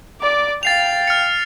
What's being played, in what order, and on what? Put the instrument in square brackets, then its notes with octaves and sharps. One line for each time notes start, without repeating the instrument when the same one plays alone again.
[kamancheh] D5 D6
[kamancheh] F5 G5 [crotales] A6 C7 F7
[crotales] F6 C#7